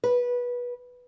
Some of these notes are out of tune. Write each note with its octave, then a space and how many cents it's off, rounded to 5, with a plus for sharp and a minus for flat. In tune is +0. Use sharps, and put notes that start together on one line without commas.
B4 -20